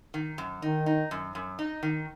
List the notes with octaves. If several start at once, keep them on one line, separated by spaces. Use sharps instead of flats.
D#3
F#2
D#3 D#4
D#4
F#2
F#2
D#4
D#3